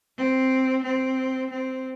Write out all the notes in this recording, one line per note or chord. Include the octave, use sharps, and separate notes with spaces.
C4
C4
C4